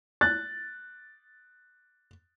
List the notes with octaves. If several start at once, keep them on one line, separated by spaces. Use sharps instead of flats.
F#6 A6